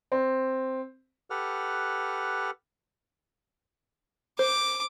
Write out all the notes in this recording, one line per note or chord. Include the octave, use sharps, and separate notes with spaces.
C4
G4 A4 B4 F#5 F6
C5 D6